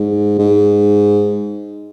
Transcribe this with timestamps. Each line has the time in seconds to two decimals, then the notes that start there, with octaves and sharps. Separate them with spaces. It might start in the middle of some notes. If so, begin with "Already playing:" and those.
Already playing: G#2
0.39 G#2